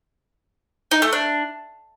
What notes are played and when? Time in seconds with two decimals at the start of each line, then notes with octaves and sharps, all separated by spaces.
0.91 D#4
1.02 A3
1.13 D4